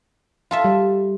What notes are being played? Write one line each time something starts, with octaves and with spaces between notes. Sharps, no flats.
F4 A4 E5
G3